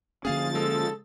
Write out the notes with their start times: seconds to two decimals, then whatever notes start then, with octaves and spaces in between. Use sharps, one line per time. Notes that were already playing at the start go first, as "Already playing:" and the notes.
0.25 D3 F3 A#3 C#4 G#4 F5 G#5 A6
0.55 G#3 A4